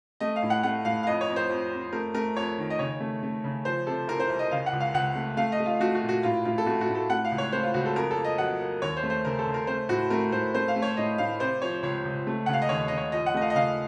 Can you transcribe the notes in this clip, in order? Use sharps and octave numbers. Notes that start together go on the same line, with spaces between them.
A3 D#5
F5
A2
F#5
A3 F#5
A2 F5
F5
F2 D#5
C#5
F2
C5
F2
F2
A3 A#4
A3 A#4
F2 C#5
D#3
D#5
C#3 C#5
A3
A3
C#3
F3 C5
C3 A4
C2 A#4
C5
C2
D#5
C#3 F5
F#5
C#2
F5
C#2 F#5
A3
A3 F5
D#5
A3
F4
A3 F#4
F#4
A#2
F#4
A2 F4
A2 F4
A4
A3 F#4
F#4
A2
A4
A3 F#5
F5
C#2
C#5
A3 C5
F4
C#2 F#4
A4
F2 A#4
A4
A#3
D#5
F#3 F#5
A#3
D#2 C#5
C5
A3
C5
C#3 A#4
A4
C#3
A#4
A3 C5
A2 F#4
A3 A#4
A2 C5
A3 C5
F5
A3
C#5
A2 D#5
A2 F5
C3 C5
F3 C#5
C#2 C#5
C#2
A3
C#3 F#5
F5
D#5
D#2 C#5
C#3 D#5
C#5
F3 D#5
F#5
A3 D#5
F5
D#5
C#3 F5